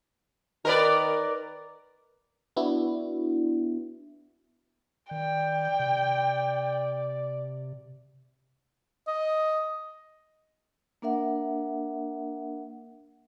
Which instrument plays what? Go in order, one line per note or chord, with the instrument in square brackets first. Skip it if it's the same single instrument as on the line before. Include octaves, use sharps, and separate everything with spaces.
[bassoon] D#3 [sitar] A#4 B4 D5
[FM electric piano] B3 D4 E4 F#4
[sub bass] D#3 [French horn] D5 [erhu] G5
[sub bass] C3
[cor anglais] D#5
[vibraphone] A#3 D4 A#4 E5 F#5